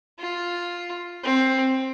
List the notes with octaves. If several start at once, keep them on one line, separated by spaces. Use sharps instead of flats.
F4
C4